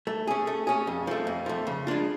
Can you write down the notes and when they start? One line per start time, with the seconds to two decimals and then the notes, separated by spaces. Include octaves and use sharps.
0.07 A3
0.27 C#4 G#4
0.47 A3
0.67 C#4 G#4
0.87 F2
1.07 F3 A3
1.27 F2
1.46 F3 A3
1.67 C#3
1.87 G#3 D4 F4